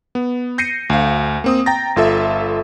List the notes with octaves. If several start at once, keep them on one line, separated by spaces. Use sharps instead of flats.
B3
G6 A#6 C7 C#7 D#7
D2 F5
A#3 C4 D#6
G5 A#5 A6 A#6
G1 F4 A4 E5